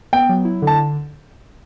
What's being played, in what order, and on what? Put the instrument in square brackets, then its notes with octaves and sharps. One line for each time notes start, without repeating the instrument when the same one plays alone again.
[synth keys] B3 [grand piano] G5
[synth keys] F#3
E4
D3
[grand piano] A5